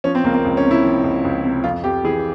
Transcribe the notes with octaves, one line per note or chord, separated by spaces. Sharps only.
F3 C#4
C4
C#2 A#3
A#3
C#2
C#4
C3
E4
F3
C#2
C#2
C3
F2 F4
F2 G4
E3 G#4